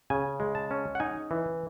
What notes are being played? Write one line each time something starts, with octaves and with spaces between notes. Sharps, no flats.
C#3 G#5
G#3
A5
C#4
F#5
D#4 G#5
E3